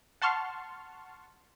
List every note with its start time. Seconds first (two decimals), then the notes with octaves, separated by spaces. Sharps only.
0.22 F#5 A5 C6 C#6 F6